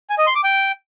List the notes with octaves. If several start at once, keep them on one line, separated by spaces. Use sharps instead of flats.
G#5
D#5
C6
D6
G5